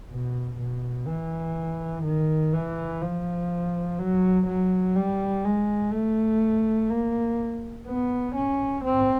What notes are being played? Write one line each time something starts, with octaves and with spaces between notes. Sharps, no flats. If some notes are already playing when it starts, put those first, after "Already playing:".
B2
B2
E3
D#3
E3
F3
F#3
F#3
G3
G#3
A3
A#3
B3
C#4
C4